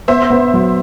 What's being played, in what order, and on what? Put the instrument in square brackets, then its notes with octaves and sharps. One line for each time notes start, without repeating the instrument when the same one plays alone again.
[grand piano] B3 [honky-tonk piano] C5 E5
[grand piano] B3
F#3